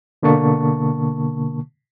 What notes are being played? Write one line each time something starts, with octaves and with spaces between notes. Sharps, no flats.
B2 D3 A#3 A5 C#6